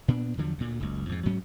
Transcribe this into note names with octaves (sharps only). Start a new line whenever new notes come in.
A#2 B3 D4
E2 D3 F3 F#3
D2 A#2
F#1 C#2
F2 G#2
D2 G#2 F#3 C#4